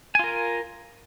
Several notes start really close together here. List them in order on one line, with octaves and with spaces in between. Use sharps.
G#5 F4 A#4